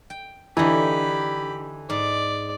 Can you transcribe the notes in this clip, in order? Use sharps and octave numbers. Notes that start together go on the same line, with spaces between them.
G5
D3 E3 D#4 G4 B5
G#2 D5